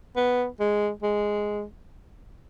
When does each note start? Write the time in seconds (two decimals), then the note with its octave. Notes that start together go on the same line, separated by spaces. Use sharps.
0.16 B3
0.60 G#3
1.03 G#3